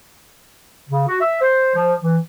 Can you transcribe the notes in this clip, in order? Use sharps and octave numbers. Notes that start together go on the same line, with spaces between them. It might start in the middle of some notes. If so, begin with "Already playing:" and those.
C#3
F#4
E5
C5
F3
E3